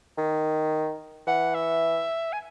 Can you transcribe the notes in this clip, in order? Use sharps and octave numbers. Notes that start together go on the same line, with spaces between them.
D#3
E3 F#5
E5
G#5